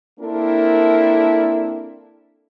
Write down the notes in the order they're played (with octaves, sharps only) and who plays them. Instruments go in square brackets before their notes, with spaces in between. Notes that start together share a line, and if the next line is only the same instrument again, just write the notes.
[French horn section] A#3 C4 D4 E4 A4 A#4